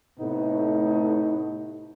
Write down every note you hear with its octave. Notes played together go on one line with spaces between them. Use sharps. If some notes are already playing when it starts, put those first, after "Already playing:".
A2 C3 A3 B3 D#4